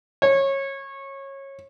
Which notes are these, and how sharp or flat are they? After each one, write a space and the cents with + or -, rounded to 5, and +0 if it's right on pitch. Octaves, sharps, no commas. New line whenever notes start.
C#5 -20